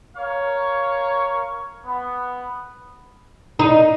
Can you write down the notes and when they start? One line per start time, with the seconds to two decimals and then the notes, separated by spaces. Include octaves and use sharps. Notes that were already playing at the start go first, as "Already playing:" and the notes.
0.15 A#4 C#5 F5 C#6
1.85 B3
3.59 D#4